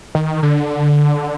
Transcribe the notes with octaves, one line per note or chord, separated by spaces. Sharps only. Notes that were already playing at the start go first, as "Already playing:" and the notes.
D#3
D3